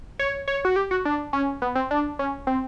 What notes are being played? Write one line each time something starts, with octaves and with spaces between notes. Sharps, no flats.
C#5
C#5
F#4
G4
F#4
D4
C#4
B3
C4
D4
C#4
C4